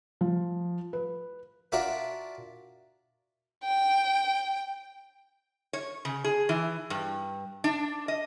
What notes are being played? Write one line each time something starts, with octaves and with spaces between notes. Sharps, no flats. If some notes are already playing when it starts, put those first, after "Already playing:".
F3
B4
D4 F4 F#4 A#4 D5 E5
G5
C#5
C#3
G#4
E3
G2
D4
D#5